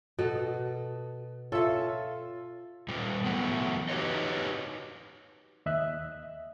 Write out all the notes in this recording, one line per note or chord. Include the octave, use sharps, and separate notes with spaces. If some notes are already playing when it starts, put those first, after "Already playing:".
B2 F#4 A4
F4 A4 C#5 E5
A#2 G3
E3 F#3 A3 B3
D#4 F#4 G4 B4 C#5 D#5
D#2 D#5 E5 F#6